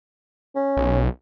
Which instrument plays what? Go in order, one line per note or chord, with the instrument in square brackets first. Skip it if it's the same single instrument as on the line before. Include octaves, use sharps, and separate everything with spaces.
[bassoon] C#4
[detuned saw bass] B1